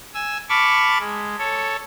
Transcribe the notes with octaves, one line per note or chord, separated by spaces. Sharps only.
G#5 E6
A5 B5 C#6 D6 F6 A6
G#3
A4 C#5